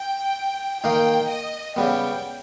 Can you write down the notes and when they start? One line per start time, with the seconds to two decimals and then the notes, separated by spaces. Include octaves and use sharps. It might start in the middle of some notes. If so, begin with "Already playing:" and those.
Already playing: G5
0.83 D#3 A#3 D#4 G5
1.30 D#5
1.76 C#3 G3 B3 G5